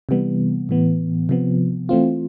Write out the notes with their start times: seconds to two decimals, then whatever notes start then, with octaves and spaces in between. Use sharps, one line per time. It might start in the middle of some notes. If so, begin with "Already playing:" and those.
0.09 C3 E3 G3 B3
0.69 A2 E3 B3
1.29 C3 F3 B3
1.89 E3 A3 C4 F4